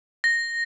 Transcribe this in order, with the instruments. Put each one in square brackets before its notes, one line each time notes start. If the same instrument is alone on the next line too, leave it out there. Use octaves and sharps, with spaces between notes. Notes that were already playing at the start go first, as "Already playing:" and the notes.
[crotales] A#6